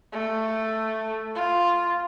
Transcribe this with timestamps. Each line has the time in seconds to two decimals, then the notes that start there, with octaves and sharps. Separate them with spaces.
0.12 A3
1.35 F4